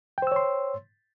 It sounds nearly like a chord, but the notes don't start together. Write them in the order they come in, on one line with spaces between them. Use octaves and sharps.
G5 C5 E6 C#5 C6